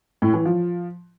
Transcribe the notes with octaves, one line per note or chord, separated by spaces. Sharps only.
A2
E3
F3